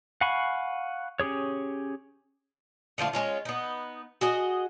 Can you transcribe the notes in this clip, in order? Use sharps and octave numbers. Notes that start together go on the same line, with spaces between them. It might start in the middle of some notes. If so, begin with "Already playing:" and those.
F5 F#5 G#5 B5 C#6
C#4 G4 G#4 C#5
D3 F3 A3 F4
G#3 C#4 F4
B3 D#4
F#4 G#4 D#5